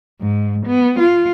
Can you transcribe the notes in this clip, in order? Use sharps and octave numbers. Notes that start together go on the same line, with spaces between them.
G#2
B3
F4